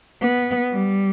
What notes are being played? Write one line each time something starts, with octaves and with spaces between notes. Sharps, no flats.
B3
G3